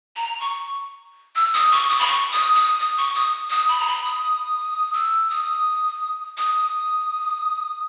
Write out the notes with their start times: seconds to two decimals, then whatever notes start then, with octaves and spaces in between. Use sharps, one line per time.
0.16 A#5
0.40 C#6
1.36 E6
1.54 D#6
1.72 C#6
1.89 D#6
1.99 B5
2.07 C#6
2.31 D#6
2.55 D#6
2.79 D#6
2.98 C#6
3.15 D#6
3.50 D#6
3.68 B5
3.80 A#5
3.87 B5
4.04 D#6
4.93 E6
5.30 D#6
6.37 D#6